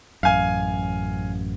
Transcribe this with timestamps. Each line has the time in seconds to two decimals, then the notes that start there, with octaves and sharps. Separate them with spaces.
0.23 A1 F#2 F5 G#5